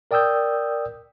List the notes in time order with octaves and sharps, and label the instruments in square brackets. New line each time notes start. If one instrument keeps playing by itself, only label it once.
[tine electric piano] A#4 D5 G5 D#6 E6 G6